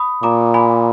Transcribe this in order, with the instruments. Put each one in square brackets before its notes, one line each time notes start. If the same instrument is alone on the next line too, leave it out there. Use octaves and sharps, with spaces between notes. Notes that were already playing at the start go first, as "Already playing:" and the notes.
Already playing: [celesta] B5 D#6
[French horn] A#2 [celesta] A#5 D6
[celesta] G#5 B5